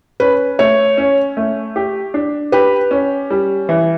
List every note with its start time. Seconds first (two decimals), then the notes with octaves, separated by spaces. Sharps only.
0.20 C#4 B4
0.59 A3 C#5
0.97 C#4
1.37 A3
1.76 G4
2.14 D4
2.52 G4 B4
2.91 C#4
3.30 G3
3.69 E3